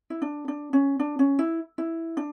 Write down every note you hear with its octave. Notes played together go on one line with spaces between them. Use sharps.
E4
D4
D4
C#4
D4
C#4
E4
E4
D4